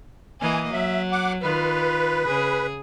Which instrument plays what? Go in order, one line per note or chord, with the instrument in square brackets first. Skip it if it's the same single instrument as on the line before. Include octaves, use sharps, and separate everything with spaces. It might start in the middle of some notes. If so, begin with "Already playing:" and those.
[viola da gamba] E3 A#3 D#5 [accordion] G#5
[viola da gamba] F#3 [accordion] E5
[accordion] F#5 D6
[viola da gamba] D#3 F4 [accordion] B4
[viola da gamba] C#3 G#4